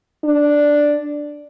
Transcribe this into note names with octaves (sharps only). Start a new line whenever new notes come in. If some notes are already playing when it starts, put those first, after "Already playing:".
D4